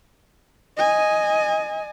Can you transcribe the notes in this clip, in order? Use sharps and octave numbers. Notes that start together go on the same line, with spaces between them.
D#5 G#5